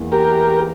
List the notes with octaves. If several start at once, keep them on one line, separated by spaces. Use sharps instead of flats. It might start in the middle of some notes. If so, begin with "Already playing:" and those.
Already playing: E2 E3 A#3
G4 A#4